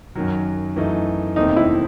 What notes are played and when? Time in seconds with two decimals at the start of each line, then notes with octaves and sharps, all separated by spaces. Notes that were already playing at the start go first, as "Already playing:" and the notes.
0.15 F#2 D#3 F#3
0.76 F#2 E3 A3 D#4
1.36 E1 D#2 D#3 A3 C4 D#4
1.56 E4